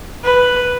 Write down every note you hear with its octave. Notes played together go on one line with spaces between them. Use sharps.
B4